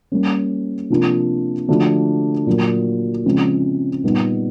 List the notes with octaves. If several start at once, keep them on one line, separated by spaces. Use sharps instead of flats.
G3 A#3 C#4
C3 F3 A#3 D4 F4
D3 F3 A3 D4 F#4
A#2 F#3 A#3
C#3 F3 G#3 C4
A#2 G3 B3 D#4